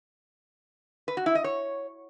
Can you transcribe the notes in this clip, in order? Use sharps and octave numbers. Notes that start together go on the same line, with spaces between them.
B4
F#4
E4
D#5
C#5